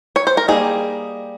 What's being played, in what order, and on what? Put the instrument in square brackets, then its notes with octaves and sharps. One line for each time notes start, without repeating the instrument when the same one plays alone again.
[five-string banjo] C#5
C5
A#4
G3 A#3 D#4 G#4